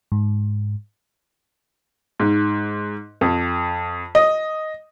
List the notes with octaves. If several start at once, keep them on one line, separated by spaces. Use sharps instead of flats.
G#2
G#2
F2
D#5